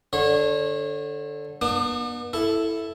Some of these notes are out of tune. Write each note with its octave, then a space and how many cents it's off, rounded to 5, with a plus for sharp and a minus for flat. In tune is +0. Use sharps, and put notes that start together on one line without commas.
D3 +0 C#5 -30
B3 -40 D4 +40 D#6 -25
E4 +0 A4 +0